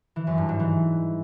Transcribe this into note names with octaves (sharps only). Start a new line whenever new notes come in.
E3
F#2
G2
G#2
E3